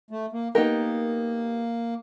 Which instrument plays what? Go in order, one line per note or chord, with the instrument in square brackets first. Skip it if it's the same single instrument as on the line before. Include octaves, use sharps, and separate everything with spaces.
[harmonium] A3
A#3
[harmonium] A#3 [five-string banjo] B3 D#4 G4 A#4